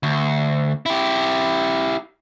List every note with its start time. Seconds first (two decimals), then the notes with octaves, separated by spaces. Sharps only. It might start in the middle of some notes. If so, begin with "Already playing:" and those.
0.03 D2
0.86 E4 G4